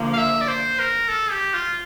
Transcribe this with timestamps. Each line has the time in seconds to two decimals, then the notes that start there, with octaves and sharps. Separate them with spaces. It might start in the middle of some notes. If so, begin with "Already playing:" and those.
Already playing: D3 F3 A#3
0.13 F5
0.18 E5
0.41 D5
0.48 C5
0.79 A#4
1.09 A4
1.31 G4
1.54 F4